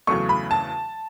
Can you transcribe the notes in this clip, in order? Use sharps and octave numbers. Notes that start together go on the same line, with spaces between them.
E2 C#3 F#3 A3 C#6
B5
A5